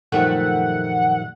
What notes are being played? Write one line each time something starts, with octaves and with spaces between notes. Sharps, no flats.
F#2 A#2 D#3 F3 G3 A3 F#5